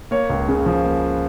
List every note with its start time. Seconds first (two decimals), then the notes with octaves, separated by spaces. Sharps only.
0.11 A#3 C#5
0.30 C#2
0.48 C#3
0.66 F3
0.85 A#3